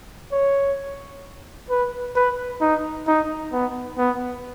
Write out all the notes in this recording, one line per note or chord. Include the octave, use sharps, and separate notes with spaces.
C#5
B4
B4
D#4
D#4
B3
B3